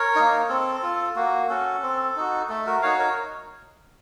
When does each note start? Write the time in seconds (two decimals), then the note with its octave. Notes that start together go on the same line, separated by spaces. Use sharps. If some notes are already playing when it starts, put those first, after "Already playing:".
Already playing: A#4 C#5
0.16 A#3 D#4
0.49 C4 A4
0.83 F4
1.16 A#3 F#4
1.50 C#4 F#4 A4
1.83 C4
2.16 D#4 F#4
2.49 A3 A4
2.66 F#4 A#4
2.82 D#4 F#4 C#5 F5
2.99 A#4 C#5